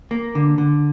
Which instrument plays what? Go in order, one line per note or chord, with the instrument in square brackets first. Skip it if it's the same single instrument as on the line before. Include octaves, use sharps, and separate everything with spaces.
[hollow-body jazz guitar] A#3
D3
D3